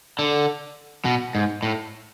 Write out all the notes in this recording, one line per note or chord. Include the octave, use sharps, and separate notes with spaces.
D3
B2
G#2
A2